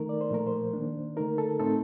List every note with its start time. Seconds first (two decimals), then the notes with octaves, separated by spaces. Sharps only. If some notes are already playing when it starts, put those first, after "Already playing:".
Already playing: D#3 A3 D#4 A#4
0.09 D5
0.21 C5
0.30 A#2 F3 A3 A#4
0.47 C5
0.73 D#3 A#3 D4
1.16 D3 A3 D#4 A#4
1.38 A4
1.59 A2 A3 C4 D#4 A4